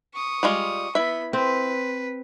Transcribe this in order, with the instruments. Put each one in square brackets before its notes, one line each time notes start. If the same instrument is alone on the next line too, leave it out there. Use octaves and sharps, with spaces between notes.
[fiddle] C#6 D#6
[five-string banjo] G3 G#3 F4
[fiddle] B3 B5 [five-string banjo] E4 E5
[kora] C4 [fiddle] B4